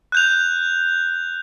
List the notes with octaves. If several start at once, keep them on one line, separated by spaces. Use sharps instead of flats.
F#6 G6 F7